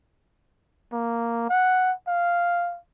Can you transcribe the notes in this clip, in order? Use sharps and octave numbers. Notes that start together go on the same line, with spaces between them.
A#3
F#5
F5